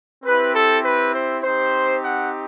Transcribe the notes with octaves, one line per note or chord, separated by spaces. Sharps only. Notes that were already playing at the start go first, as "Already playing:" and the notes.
C4 E4 G4 B4
A4
B4
C5
C4 D#4 G4 C5
F#5